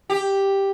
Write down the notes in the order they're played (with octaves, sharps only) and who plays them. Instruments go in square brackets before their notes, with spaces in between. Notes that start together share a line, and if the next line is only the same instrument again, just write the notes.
[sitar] G4